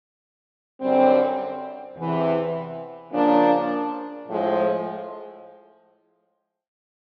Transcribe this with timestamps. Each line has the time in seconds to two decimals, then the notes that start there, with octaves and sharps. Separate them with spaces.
0.81 F#2 D3 G3 C4
1.96 E2 C3 E3
3.11 C#3 F3 A#3 D4
4.27 A2 F3 G#3